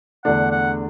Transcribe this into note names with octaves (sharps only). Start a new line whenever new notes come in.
E2 D3 A3 D4 F#5
F#5